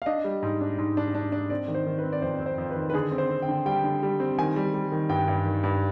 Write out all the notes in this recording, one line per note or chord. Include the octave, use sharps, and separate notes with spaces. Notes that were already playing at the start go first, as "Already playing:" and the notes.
F5
D4 D#5
G3
G#2
D4
G#2
D4
D4
D4
C4 D5
D#3
C5
D#3
B4
C4
D5
F2 C5
C4
C5
F2
B4
D#3
B4
D3 G#4
C4
C5
C4
G5
D3
G3 G5
D3
G3
C4
D#3 G#5
G3
G3
D#3
G2 G5
G2
D#3
G2